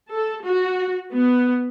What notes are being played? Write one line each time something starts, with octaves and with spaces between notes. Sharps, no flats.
A4
F#4
B3